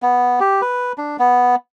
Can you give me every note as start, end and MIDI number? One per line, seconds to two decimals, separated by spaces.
0.02 0.39 59
0.40 0.61 67
0.62 0.93 71
0.98 1.17 62
1.19 1.55 59